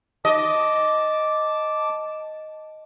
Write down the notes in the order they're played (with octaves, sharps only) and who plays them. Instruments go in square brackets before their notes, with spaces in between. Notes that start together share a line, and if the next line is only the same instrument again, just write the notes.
[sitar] D#5 [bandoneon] A5 D6